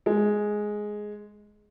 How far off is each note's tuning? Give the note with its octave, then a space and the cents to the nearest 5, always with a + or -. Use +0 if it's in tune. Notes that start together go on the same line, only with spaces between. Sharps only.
G#3 +5